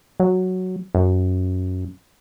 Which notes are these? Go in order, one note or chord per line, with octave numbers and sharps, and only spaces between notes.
F#3
F#2